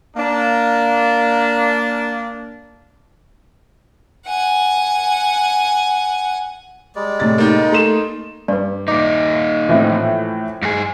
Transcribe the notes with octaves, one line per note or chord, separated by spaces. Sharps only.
A#3 D4
F#5 G#5
G3 G#3 D5
A2 C3 A6
A#3 D#4
A3 C6 E7
G2 B4 D5
A#2 D#4 D6
A2 E3 F3 C4
G2 G#4